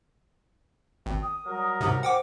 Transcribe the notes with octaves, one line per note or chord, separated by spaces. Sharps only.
G#1 G5
D#6
F#3 G3 A#4
G#2 C3
C5 F#5 G5 D6